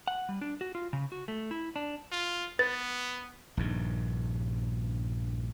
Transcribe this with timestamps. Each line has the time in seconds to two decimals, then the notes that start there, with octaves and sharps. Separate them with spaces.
0.08 F#5
0.29 G3
0.41 D4
0.61 F#4
0.75 F4
0.93 C#3
1.12 F#4
1.28 A3
1.51 E4
1.76 D4
2.11 F4
2.59 B3 B4 A6
3.57 A#1 G2 D#3